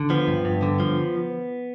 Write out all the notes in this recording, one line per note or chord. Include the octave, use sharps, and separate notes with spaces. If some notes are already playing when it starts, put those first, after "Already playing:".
Already playing: D3
F3 B3
G2
G2
D3
F3